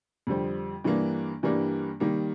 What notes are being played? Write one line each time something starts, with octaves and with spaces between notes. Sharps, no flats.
F2 D3 G3 C4
G2 E3 G3 A#3 D4
G2 E3 G3 A#3 D4
D#3 G3 A#3